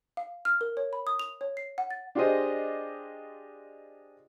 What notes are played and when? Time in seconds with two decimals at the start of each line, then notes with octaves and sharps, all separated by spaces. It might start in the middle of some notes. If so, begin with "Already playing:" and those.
0.17 F5
0.45 F6
0.61 A#4
0.77 C#5
0.93 B5
1.07 D#6
1.19 F7
1.41 C#5
1.57 C7
1.78 F#5
1.90 A6
2.15 D4 F4 G4 G#4 C5 D#5